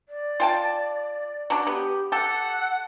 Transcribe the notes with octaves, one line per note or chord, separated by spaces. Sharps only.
D5
F4 G5 A5
F#3 D4
B3 G4
G4 A4 F#5